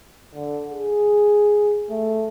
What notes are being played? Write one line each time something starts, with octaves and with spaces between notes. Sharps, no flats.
D3
G#4
A3